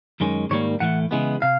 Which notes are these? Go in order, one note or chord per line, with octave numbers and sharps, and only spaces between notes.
F#2 D#3 G#3 C#4
G#2 D#3 G3 A#3 C#5
A2 E3 A3 F#5
C#3 E3 G#3 B3
C3 F5